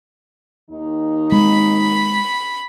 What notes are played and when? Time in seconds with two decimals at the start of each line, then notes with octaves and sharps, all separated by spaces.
0.70 D#2 D#3 D#4
1.32 G#3 C4 B5